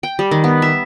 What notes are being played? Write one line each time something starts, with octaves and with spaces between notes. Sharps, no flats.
G5
G3
D#3
B3
E5